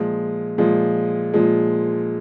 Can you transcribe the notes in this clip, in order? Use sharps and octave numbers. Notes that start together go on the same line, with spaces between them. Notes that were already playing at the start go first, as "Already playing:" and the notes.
Already playing: A#2 F3 G#3
A#2 F3 G#3
A#2 F3 G#3